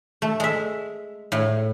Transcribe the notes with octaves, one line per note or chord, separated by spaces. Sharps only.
A3
G#3 E5
A2